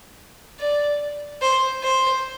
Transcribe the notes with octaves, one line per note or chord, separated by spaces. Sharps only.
D5
C5
C5